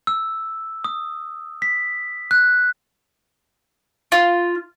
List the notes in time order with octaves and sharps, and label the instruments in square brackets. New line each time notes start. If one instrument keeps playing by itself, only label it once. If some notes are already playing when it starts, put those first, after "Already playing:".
[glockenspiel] E6
D#6
B6
F#6
[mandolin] F4